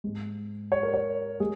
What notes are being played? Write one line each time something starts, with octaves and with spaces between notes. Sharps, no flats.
G#2 G#3
C#5
A#4
C#5
G#3 G#4